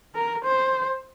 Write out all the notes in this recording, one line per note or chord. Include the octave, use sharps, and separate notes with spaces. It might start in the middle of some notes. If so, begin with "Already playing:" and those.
A#4
C5